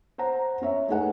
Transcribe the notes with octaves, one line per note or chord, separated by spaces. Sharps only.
C5 F#5 A#5
C#4 C#5 E5
A3 D#4 G#4 B4 F#5 G#5